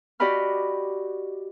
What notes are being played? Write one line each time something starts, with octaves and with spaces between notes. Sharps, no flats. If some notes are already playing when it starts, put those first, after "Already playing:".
F#4 G4 D5 D#5 B5 F6